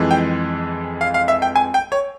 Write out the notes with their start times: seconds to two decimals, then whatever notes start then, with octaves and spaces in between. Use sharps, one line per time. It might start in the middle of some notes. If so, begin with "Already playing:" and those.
Already playing: F2 E3 G#3
0.11 G5
1.01 F5
1.14 F5
1.28 E5
1.42 G5
1.56 G#5
1.74 G5
1.92 C#5